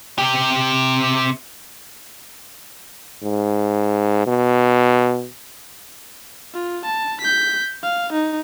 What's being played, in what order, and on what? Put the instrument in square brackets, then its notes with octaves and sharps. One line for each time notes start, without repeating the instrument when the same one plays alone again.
[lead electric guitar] C3 G4
[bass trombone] G#2
B2
[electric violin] F4
A5
G6 B6
F5
D#4